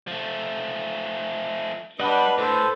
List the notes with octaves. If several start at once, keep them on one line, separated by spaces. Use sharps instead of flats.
F3 A3
G3 D4 B4 D#5 F#5 B5
A2 A4 B4 C5